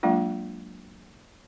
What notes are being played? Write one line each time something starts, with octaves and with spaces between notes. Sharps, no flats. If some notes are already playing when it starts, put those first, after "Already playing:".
F#3 G#3 A#3 D4 F4